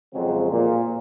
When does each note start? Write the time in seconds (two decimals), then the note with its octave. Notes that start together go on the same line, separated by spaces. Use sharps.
0.14 F2 C#3 F#3 G#3 C4
0.51 A#2